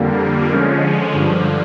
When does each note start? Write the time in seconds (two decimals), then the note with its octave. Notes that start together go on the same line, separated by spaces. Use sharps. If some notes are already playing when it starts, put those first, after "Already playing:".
Already playing: F2 D3 G3 A#3
0.50 D3 F3 G#3 C#4
1.12 G2 D3 F3